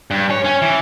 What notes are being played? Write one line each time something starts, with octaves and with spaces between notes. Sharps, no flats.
G2
C#5
C#4
E3